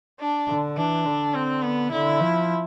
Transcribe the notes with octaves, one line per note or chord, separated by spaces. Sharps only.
D4
D3
E3 D4
D3
C4
B3
D3 E4
F3